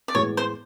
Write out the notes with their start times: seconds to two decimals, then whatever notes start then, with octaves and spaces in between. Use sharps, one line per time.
0.08 D5
0.15 A2 E3 G#3 B3 C#5
0.37 C5